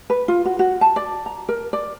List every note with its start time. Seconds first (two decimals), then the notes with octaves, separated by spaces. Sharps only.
0.10 B4
0.28 F4
0.45 F#4
0.59 F#4
0.81 A5
0.96 D5
1.26 A#5
1.49 A#4
1.73 D5